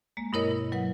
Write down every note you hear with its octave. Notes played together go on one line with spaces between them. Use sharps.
G#3 A#3
G2 B2 E4 A#4 C#5 D#5
E4
F#3 B4 F#5